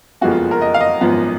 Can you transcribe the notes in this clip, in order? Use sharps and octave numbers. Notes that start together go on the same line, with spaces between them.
F#1 F2 F3 G#3 B3 F#4
F4
A#4
D#5
F5
D#5
G#1 F#2 F3 B3